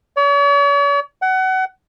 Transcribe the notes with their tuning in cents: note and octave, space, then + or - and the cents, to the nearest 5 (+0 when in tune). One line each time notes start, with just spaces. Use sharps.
C#5 +45
F#5 +25